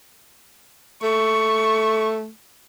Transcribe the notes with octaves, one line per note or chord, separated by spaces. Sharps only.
A3 C#6